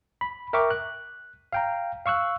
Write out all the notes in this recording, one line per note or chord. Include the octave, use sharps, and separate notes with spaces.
B5
A#4 E5 G5 C#6 D6
F#6
F5 G5 A#5
F5 C#6 E6 F#6